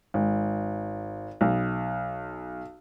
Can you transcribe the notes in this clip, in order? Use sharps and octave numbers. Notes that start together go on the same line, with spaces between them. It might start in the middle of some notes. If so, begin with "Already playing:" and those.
G#1
B1